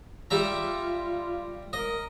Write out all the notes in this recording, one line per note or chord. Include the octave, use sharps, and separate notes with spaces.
G3 F4 E5 A#5
A#4 D#5